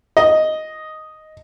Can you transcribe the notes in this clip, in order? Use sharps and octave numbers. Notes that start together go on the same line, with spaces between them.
D#5